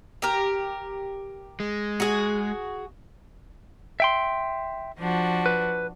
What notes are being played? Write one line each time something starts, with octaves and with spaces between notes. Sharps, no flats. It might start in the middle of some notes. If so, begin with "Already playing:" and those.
G4 A#4
G#3
F#4 G#4
E5 G5 C6
F3 D4 F#4
B4